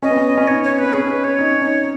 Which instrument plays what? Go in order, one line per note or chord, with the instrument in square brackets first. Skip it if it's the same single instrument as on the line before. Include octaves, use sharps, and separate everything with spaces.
[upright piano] C#4 [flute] D#5
[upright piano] B3
C#4
C#4
[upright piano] D#4 [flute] C#5
[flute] C#5
[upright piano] B3 [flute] B4
[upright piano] C#4 [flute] G#4
[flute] B4
C#5
[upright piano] D#4
C#4
D#4